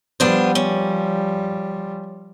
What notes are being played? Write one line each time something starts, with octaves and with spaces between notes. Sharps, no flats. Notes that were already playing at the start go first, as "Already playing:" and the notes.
F3 G3 B3 D4 C5
C#4